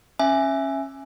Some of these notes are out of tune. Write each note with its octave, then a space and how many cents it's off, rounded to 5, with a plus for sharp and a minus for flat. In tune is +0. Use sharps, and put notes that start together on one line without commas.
C#4 -20 E5 +5 G#5 +0